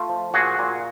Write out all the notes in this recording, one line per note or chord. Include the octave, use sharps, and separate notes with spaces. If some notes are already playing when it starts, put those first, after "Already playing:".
Already playing: A3 F4
F3
A#2 F#4 G#4
A#2